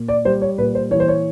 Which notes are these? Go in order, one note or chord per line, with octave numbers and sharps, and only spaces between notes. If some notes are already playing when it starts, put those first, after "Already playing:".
Already playing: A#2
D5
G3 C5
C#5
A#2 B4
C5
E3 C#5
C5
C#5